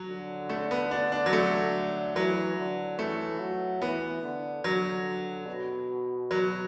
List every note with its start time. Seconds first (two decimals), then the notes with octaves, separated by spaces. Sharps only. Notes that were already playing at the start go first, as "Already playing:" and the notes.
Already playing: F#3
0.09 D3
0.49 A3
0.71 B3
0.91 D4
1.12 D4
1.26 F#3
1.33 A3
2.16 E3 F#3
2.57 D3
2.98 E3 A3
3.39 F#3
3.81 E3 B3
4.22 D3
4.64 D3 F#3
5.47 B2
6.31 F#3